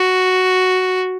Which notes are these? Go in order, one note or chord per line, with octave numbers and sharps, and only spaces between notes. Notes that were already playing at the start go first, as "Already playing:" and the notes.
Already playing: F#4